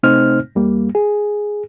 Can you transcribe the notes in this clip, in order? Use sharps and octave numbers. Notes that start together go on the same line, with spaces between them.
C3 A3 C4 D#4 C5 F6
E2 G3 A#3
G#4